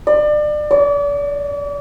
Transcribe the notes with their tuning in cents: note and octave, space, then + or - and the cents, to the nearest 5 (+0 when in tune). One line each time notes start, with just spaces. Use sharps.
D5 +30
D5 -40